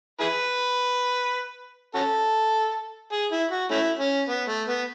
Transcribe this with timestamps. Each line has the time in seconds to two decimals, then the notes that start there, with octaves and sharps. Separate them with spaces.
0.20 E4 G#4 B4
1.95 C#4 F#4 A4
3.12 G#4
3.32 E4
3.51 F#4
3.71 A3 C#4 E4
3.99 C#4
4.29 B3
4.49 A3
4.68 B3